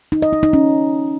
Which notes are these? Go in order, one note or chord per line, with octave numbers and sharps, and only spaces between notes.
D#4
D#5
D#4
D#4
C#4